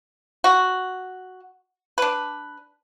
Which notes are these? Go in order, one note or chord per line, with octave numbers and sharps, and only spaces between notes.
F#4
D4 B4